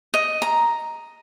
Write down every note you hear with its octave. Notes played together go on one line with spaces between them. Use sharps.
D#5
A#5